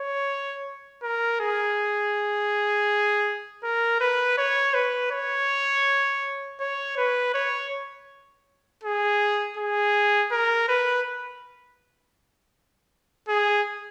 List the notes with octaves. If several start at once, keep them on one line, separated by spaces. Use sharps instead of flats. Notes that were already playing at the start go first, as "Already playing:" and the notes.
Already playing: C#5
A#4
G#4
A#4
B4
C#5
B4
C#5
C#5
B4
C#5
G#4
G#4
A#4
B4
G#4